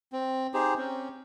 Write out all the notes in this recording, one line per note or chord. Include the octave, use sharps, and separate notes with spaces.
C4
D#4 G4 G#4 C5
C4 C#4